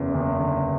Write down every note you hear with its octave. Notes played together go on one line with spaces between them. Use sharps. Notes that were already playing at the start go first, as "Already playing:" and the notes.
Already playing: F#1 E2
F#1
D3